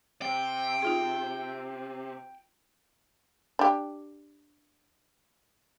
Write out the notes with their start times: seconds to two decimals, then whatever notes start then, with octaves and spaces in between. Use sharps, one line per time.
0.22 C3 G5
0.82 D#4 F4 G#4
3.59 D4 G4